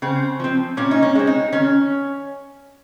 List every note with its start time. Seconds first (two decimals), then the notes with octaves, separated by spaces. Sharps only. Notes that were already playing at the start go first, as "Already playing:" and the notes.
0.02 C#3 C4
0.40 F3 C4
0.77 A#2 C#4
0.91 D#4
1.03 C#4
1.15 G#3 C4
1.27 D#4
1.53 D#3 C#4